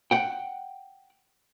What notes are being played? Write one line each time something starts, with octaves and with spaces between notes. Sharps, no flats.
F#5 G5